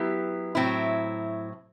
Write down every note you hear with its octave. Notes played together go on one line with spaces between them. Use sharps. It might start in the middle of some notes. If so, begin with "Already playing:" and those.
Already playing: F#3 B3 E4 G4
A2 F#3 C4 E4